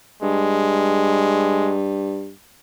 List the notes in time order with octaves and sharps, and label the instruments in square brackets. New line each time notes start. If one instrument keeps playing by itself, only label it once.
[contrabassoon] G2 [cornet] G#3